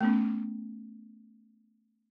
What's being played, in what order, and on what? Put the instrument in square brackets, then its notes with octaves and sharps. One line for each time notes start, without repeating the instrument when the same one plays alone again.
[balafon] A3 B3 C#4